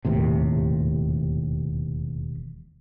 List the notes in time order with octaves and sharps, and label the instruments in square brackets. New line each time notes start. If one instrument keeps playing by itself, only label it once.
[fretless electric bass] E1 D#2 A2 C3